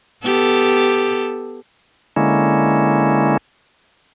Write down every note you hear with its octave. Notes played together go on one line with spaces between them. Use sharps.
B3 G4 A4
D3 G#3 A#3 C#4 E4